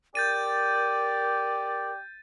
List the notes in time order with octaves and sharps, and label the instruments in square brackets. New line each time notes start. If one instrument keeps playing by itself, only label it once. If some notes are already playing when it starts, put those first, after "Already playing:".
[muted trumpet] G4 [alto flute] A#4 [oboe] D5 [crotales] G6 A6 D#7